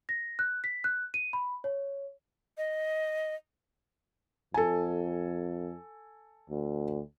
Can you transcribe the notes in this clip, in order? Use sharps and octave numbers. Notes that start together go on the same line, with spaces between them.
A#6
F#6
B6
F#6
D#7
B5
C#5
D#5
F2 A4 G#5
D2